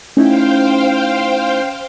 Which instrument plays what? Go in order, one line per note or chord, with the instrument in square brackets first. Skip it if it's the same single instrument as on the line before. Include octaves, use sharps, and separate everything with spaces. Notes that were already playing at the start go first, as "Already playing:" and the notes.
[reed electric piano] A3 D#4 E4 [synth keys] C#4 [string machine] C5 F5 G5